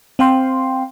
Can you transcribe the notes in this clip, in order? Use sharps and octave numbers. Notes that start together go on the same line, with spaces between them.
C4 F5 G5 C6